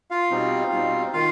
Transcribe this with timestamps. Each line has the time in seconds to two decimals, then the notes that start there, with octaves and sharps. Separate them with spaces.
0.11 F4 F5
0.31 B2 G3 C4 D#4
0.72 B2 G3 C4 D#4
1.13 D#3 F4 F5